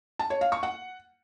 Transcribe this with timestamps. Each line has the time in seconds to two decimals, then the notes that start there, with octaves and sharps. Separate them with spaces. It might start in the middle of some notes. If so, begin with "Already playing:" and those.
0.19 A5
0.30 C#5
0.41 F5
0.52 C#6
0.63 F#5